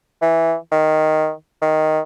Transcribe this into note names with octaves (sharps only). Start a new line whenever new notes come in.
E3
D#3
D#3